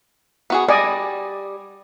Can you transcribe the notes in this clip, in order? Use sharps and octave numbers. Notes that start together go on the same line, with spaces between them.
B3 F#4 G#4
G3 D5 D#5 G#5